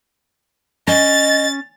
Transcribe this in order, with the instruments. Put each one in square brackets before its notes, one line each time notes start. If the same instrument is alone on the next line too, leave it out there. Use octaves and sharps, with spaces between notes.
[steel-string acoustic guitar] C#4 [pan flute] D#5 [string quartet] A6